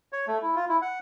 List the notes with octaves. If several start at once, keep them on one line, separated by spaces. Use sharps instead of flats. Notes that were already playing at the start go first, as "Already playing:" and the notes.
C#5
A3
E4
F4
E4
F#5